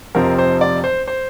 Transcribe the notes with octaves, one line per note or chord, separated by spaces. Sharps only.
F1 F2 C3 F3 C4 A#4
C5
D5
C5
C5